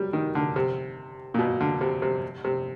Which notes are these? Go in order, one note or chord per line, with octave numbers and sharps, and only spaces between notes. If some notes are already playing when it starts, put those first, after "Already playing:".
Already playing: F#3 G3
D#3
D3
C3
A#2
B2
D3
C3
C3
C3